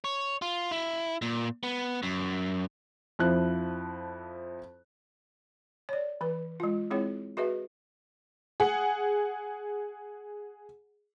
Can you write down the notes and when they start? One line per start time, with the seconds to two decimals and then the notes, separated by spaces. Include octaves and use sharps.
0.04 C#5
0.42 F4
0.71 E4
1.22 A#2
1.63 B3
2.03 F#2
3.19 F2 F3 E4 F#6
5.89 C#5 D5
6.21 E3 B4
6.60 G#3 F4
6.91 G#3 C4 E4 G#4 C#5
7.37 F#4 G#4 B4 D#5 E5
8.60 G#4 F#5